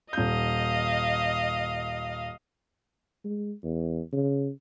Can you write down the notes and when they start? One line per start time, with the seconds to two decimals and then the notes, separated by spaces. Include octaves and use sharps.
0.13 D#1 D#5 F5 G6
3.25 G#3
3.64 E2
4.13 C#3